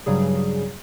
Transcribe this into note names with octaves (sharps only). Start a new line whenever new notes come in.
G2 C#3 F#3 G3 G#4